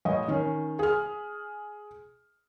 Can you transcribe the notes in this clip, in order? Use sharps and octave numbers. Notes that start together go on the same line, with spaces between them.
A1 D#5
D#3 C#4
G#4 F6